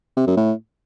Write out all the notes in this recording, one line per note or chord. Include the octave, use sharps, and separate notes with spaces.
C3
F#2
A2